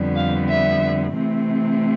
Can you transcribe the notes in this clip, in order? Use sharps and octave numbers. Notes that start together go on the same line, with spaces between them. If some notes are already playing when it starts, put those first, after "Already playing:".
Already playing: F2 D3 G3 B3
F5
E5
C3 E3 A3 C4